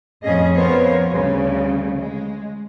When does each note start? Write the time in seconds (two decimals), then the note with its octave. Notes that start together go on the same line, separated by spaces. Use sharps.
0.23 F2 A2 C#4 G#4 D#5
0.56 F3 B3 A#4 C5 C#5
1.10 D2 C#3 G3
1.95 G#3